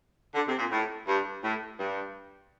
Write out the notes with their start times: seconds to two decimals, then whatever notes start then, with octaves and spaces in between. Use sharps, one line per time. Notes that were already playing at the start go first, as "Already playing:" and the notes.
0.35 D3
0.48 C3
0.59 A#2
0.71 A2
1.08 G2
1.43 A2
1.79 G2